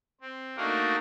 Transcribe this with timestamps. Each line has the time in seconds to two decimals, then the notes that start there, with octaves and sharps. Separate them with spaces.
0.21 C4
0.57 A3 A#3 D4 D#4 F#4 A#4